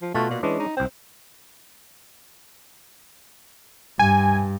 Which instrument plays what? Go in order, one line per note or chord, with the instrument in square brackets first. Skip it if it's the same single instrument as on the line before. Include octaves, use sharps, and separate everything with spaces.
[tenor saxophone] F3
[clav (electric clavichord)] B2 F4 F#4 [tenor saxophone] A3
[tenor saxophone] A#2
[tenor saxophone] E3 [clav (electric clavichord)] G#3 C#4 D4
[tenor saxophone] D#4
[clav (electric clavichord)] C2 G5 [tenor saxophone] C4
[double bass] G2 [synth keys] G#5